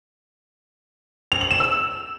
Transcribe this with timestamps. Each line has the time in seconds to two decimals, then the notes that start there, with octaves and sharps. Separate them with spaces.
1.32 F7
1.41 F#7
1.51 E7
1.60 E6